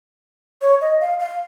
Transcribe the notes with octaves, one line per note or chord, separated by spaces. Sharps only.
C#5
D#5
F5
F5